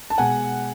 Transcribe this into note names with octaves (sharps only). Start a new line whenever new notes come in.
A5
B2 G#3 F#5 G#5